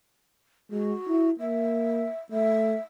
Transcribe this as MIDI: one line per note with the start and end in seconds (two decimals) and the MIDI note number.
0.71 0.94 56
0.71 1.29 66
1.08 1.31 64
1.39 2.08 58
1.39 2.18 76
2.31 2.76 57
2.31 2.80 76